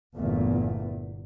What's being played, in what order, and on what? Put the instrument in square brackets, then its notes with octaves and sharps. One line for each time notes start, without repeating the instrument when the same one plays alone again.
[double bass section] G1 E2 A#2 A3